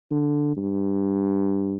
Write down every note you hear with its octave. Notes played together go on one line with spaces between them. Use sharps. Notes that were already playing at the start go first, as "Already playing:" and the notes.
D3
G2